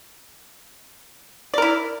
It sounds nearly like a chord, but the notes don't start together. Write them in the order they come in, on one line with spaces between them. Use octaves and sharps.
D5 A#4 E4